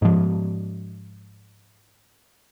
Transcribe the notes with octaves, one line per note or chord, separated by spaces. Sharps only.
G#2 F3